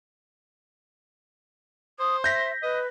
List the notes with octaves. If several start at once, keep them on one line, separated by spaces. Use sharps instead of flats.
C5 D#6
E5 G6 A#6 B6
B4 D#5